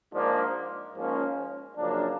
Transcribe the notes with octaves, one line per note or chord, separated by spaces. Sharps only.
G#2 F3 A#3 D4
G#2 F3 A#3 C#4
F#2 C#3 F3 A#3 D4